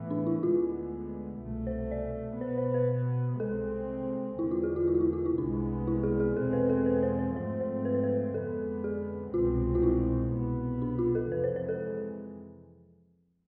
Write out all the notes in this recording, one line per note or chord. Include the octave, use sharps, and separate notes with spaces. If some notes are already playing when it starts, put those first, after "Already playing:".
Already playing: A2 E3 B3
D4
E4
D2 D3 G#3 B3 F4
C2 B2 A3
C5
D5
B2 B3 C5
C5
B4
C2 C3 G#3 C4 A4
E2 D3 G#3 E4
F4
G#4
F4
E4
F4
E4
F4
E4
C2 C3 G#3 B3 D4
E4
G#4
G#4
E2 B2 G#3 C4 A4
B4
A4
B4
C5
C5
G#2 F3 A3 C4 C5
C5
B4
C5
B4
F2 D3 G#3 B3 A4
G#4
C2 B2 G#3 C4 F4
F4
E4
C2 B2 B3
D4
F4
A4
F2 C3 E3 G#3 B4
C5
C5
A4